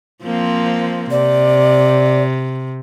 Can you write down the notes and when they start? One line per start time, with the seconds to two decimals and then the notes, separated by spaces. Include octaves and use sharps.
0.25 F3 A#3 C4
1.11 C3 D5